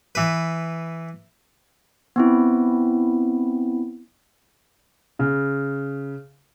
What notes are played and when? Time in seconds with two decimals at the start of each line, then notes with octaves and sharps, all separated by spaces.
0.15 E3 B4
2.16 B3 C4 E4
5.19 C#3